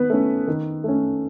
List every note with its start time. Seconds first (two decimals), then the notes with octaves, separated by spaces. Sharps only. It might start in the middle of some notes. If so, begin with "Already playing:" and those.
Already playing: D#3 B3 B4
0.10 A3 C#4
0.48 D#3
0.84 A3 C#4